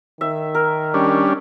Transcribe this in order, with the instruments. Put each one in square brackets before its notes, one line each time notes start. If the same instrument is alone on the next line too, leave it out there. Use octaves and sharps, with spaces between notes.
[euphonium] D#3 [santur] E5
[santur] A#4
[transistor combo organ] G3 C#4 D4